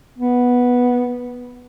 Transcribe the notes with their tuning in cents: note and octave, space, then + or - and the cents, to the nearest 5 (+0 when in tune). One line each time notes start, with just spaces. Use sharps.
B3 -5